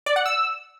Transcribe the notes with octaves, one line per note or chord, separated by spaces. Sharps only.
D5
F#5
E6